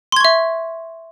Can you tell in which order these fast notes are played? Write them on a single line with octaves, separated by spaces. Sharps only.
C6 G#6 C#6 E5